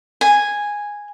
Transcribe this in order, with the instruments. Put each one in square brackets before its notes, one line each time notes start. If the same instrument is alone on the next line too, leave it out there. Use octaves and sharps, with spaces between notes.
[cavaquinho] G#5